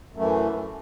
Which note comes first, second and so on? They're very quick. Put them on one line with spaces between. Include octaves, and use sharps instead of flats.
F#2 A3 E3